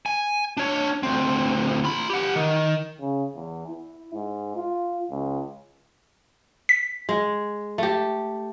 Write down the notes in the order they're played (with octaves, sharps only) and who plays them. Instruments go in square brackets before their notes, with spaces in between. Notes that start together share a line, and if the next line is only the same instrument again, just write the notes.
[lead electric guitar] G#5
D4 C#5
D2 C4
F4 B5
G4 F#5
D#3
[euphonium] C#3
E2
E4
G#2
F4
C#2
[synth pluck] B6
[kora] G#3
A3 G4